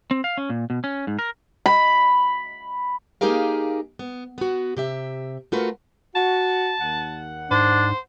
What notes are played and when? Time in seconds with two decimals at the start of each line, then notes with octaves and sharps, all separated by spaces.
0.11 C4
0.24 F5
0.37 C#4
0.50 A#2
0.70 B2
0.84 C#4
1.07 G#2
1.19 A#4
1.66 B5
3.21 A#3 D#4 G4 G#4 A#4 F5
3.99 B3
4.38 B3 F#4
4.77 C3 G4 E5
5.52 A3 F4 F#4 A#4 B4
6.15 F#4 A5
6.81 D#2 F#5
7.51 G#2 D4 C5